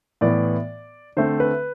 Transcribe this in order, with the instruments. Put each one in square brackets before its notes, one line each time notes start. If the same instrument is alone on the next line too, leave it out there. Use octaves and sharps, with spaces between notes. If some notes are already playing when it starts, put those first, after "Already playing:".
[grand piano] A2 E3 B3 D5
D3 A3 C4 C5
B4